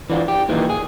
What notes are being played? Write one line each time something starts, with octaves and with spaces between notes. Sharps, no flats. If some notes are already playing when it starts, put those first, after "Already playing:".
E3 D4 F4
G4
A#2 D#3 E3 A#3
G#4